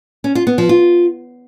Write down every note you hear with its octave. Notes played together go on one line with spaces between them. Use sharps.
C#4
F4
B3
F3
F4